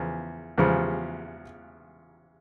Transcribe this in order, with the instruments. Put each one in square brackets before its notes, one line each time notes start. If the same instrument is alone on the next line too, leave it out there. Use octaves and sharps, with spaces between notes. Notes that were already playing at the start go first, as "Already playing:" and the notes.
Already playing: [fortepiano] E2 C#3 F3
E2 C#3 F3